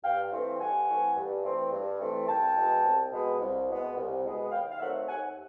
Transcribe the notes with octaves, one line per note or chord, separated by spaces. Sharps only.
G2 F5 G5
E3 A3 C4
G2 F#5 G#5
E3 A3 C4
G2
E3 A3 C4
G2
E3 A3 C4
C2 G5 A5
B2 G#3 B3
C2
B2 G#3 B3
C2
B2 G#3 B3
C2
B2 G#3 B3
D#2 F5 G5
F5
D#3 F#3 A3 C4 E5 F#5
D#2 F#5 G#5